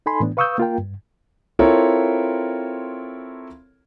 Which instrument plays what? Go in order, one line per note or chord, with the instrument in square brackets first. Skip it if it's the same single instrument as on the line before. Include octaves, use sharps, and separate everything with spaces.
[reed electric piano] D#4 A4 G#5 B5 C6
A2 E3 B3 D4
B4 F5 C#6 D#6 E6 G6
A#3 F4 A#4 G5
G2
[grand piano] C4 E4 F4 A4 A#4 C#5